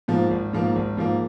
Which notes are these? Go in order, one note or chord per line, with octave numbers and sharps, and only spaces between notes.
G#2 F3 A#3
G#1
G#2 F3 A#3
G#1
G#2 F3 A#3